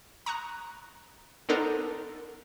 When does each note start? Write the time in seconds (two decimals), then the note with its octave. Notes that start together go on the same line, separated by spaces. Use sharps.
0.26 A#5 C#6 D#6 F#6
1.49 B3 D4 D#4 A4 A#4 C5